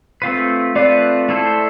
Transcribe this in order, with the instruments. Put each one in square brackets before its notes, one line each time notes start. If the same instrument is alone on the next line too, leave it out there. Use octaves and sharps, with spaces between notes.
[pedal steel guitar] A3 C4 F4 B4
[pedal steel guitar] A3 C4 F4 B4 [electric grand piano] D5
[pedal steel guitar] A3 E4 A4 C5